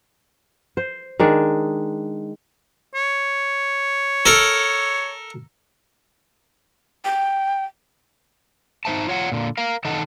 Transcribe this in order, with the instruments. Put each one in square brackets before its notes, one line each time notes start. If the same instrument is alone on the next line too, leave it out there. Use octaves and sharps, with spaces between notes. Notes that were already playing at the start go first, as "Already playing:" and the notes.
[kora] C5
D#3 G#3 D4
[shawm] C#5
[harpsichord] A4 A#4
[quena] G5
[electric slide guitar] D#4 E4 C5 E5 A5
F4 C#5 F#5
A#2 D3
A#4 F5
D#3 D#4 A4 F#5 A5